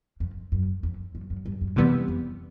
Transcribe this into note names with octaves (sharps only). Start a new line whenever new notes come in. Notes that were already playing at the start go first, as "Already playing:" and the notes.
F2
F#2
F2
F#2
F#2
G2
F#2
F2 C3 E3 G3 B3
F2